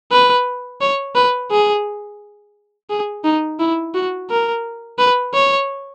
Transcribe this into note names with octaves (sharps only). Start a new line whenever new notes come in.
B4
C#5
B4
G#4
G#4
D#4
E4
F#4
A#4
B4
C#5